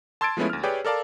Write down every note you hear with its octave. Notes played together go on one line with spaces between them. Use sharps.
A5 C6 E6 G#6 A6 D7
F3 G#3 A3 B3 C#4 E4
D2 F6
G4 G#4 B4 C#5 D5 G5
A4 A#4 D5 F5 A5